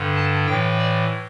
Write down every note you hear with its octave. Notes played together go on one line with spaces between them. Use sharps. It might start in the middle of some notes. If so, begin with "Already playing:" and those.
Already playing: G2 D3
A5
A2 E3 G5
D5